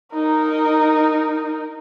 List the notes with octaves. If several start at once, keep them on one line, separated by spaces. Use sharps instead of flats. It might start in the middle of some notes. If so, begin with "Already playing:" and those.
D#4 A#4